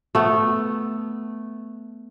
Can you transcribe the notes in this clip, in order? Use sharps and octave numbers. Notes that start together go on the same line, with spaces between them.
A3 B3